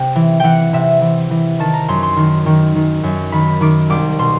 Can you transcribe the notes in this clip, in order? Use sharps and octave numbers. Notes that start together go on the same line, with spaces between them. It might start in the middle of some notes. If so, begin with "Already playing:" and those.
Already playing: C3 G5
E3
E3 F#5 G5
C3 E5
E3
E3
D#3 A5
A#5
F#2 C6
C6
D#3
D#3
D#3
F#2
D#3 B5
D#3 D6
C2 D6
B2 C6